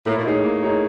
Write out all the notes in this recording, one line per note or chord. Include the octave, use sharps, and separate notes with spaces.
A2 A#3
A#2
A2 D#4 G#4 C#5
A#3
D#4 G#4 C#5